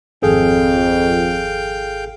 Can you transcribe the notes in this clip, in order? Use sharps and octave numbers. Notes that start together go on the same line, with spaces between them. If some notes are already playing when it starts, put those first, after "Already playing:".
G#1 F2 G#4 A4 F5 G5